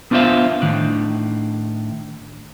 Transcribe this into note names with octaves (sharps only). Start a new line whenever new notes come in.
B3 D4 F4 C5 E5 F5
A2 D#3 D4